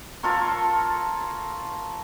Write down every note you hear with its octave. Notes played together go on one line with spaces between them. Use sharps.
F4 A4 A#4 C#5